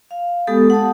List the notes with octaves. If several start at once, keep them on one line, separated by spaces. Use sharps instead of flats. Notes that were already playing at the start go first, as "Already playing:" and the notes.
F5
G#3 B3 G4 A4 D#6
F#5 A5 D#6